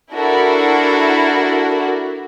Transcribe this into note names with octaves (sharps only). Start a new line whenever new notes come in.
D4 E4 F#4 A4 A#4